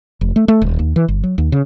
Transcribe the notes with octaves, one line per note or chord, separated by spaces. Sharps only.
F1
A3
A3
D#1
D#2
E3
G1
F#3
D#2
C#3